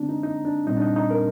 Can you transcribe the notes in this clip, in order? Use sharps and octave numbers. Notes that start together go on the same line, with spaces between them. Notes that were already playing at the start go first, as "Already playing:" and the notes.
Already playing: D3 G#3 C4 D4
D#4
D#4
D4
A#2 G3 C4 D#4
D4
D#4
D#4
A#4